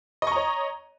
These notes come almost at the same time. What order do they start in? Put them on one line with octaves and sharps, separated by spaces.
D#5 C#6 A#5 C#5